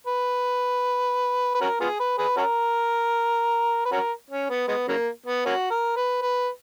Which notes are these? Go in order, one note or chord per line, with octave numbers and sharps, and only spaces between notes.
B4
B4
C#4 F#4 A#4
B3 F4 G#4
B4
G#4 B4
C#4 F#4 A#4
B4
C#4 F#4 A#4
C#4
B3
G#3 B3
C#3 F#3 A#3
B3
A#3 C#4 F#4
A#4
B4
B4